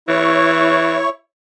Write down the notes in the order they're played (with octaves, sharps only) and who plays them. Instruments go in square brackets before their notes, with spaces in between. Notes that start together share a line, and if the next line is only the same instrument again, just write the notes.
[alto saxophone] E3 [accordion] E4 C#5 C#6